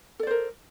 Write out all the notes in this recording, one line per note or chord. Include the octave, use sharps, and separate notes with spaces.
A4 A#4 C5 D5